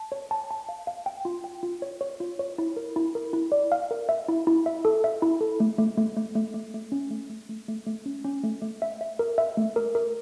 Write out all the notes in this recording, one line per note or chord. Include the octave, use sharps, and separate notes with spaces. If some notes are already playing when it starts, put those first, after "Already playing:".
Already playing: A5
C#5
A5
A5
F5
F5
G5
F4
G5
F4
C#5
C#5
F4
C#5
E4
A#4
E4
A#4
E4
D5
F5
A#4
E5
E4
E4
E5
A4
E5
E4
A4
A3
A3
A3
A3
A3
A3
A3
C#4
A3
A3
A3
A3
A3
C#4
C#4
A3
A3
E5
E5
A#4
E5
A3
A#4
A#4